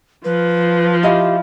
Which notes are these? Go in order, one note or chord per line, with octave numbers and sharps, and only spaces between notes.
F3 B4
E4 G4 D#5 F5